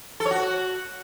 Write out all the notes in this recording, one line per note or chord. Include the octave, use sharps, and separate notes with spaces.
A4
C#5
F#4